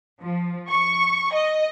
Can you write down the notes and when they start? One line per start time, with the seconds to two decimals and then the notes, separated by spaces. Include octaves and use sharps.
0.21 F3
0.68 C#6
1.33 D#5